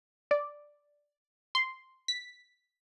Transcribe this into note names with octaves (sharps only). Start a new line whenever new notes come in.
D5
C6
B6